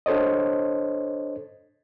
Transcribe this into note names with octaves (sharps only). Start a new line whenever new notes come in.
D4 A4 C5 C#5 D#5